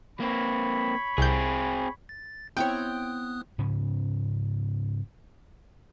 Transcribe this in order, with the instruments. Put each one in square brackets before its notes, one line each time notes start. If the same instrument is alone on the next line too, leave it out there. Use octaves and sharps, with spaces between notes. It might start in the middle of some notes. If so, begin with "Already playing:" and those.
[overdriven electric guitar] A#3 C4 [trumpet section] C#5 B5
[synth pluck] C2 G6 [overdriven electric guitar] C4 G#4
[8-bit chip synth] A6
[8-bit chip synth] B3 D#6 F#6 [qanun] C4 E4 C#5 [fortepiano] G5
[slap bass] G#2 C#3 C#4